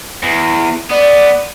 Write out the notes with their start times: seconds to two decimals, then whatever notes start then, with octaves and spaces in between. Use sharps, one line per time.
0.23 E2
0.91 B3 D5